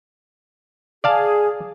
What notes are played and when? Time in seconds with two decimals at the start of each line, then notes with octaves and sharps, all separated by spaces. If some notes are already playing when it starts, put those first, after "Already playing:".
1.04 G#4 D5 F5 A5